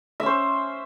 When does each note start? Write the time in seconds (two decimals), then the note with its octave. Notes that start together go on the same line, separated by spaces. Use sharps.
0.20 E5
0.23 C#4
0.26 C5